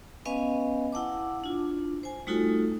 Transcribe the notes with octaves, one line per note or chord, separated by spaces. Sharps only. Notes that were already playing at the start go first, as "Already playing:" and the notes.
B3 C#4 B4 D#5 F5 G#5
E4 F#5 A5 D6
D4 F4
C5 G#5
G3 A3 D#4 F4 F#4 A4